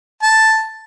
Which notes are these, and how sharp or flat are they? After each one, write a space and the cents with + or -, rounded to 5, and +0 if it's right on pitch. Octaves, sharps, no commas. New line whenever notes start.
A5 +0